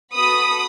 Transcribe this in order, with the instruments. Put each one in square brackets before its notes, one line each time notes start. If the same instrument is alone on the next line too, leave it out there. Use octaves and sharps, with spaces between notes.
[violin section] B3 F#4 A4 B5 D#6